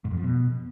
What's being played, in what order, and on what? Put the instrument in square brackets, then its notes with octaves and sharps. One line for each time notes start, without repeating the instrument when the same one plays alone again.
[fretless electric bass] G#2
F2
F3
B2